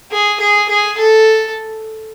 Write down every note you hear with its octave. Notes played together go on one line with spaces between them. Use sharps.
G#4
G#4
G#4
A4